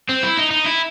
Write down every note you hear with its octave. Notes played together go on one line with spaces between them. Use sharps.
C4
E4
D#4
D#4
E4